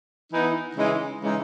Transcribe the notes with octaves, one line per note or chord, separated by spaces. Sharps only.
E3 B3 D#4
C#3 E3 G#3 D#4
C#3 E3 G#3 D#4